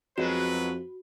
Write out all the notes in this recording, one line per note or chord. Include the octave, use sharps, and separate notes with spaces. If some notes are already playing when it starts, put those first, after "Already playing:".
F2 F#3 G#3 B3 F#4 B4